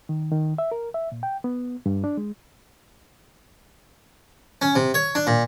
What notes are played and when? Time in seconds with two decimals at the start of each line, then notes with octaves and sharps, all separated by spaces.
0.09 D#3
0.32 D#3
0.58 E5
0.72 A#4
0.94 E5
1.12 A#2
1.23 G5
1.44 B3
1.86 G2
2.04 D4
2.17 G#3
4.62 C#4
4.75 C3
4.94 C#5
5.15 D4
5.27 A#2